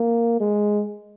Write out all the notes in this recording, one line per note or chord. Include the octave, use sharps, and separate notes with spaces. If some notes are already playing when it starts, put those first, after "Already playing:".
Already playing: A#3
G#3